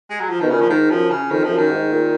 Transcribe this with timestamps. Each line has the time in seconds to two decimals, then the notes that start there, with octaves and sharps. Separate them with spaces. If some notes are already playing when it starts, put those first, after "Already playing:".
0.10 G#3
0.20 F#3
0.30 F3
0.40 B2 D#3
0.50 A#2 C#3
0.61 F3
0.70 G#2 D#3
0.90 F#2 F3
1.11 C#3
1.30 F2 D#3
1.44 F2 F3
1.51 F#2
1.58 D#3
1.71 G#2
1.91 A#2